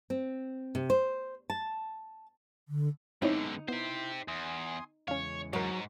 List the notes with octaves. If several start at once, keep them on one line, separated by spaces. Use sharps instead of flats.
C4
C3
C5
A5
D3
F#2 D3 G#3 B3 C4 D#4 E4 C#5
B3 E4 G4 C5
E2 G#5 C6 D#6
E2 C#3 G#3 C#4 C#5 F5
G#2 F#3 A#4 C#5